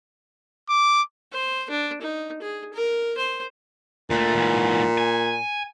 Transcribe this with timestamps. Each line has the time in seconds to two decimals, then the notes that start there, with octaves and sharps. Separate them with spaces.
0.69 D6
1.33 C5
1.70 D4
2.02 D#4
2.42 G#4
2.74 A#4
3.18 C5
4.10 D2 A#2 A3
4.35 G#2 E3
4.98 G#5